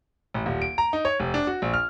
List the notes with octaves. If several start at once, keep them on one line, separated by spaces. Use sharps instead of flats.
A1
D#1
D7
A#5
D#4
C#5
F1
D4
F#4
A#1
F6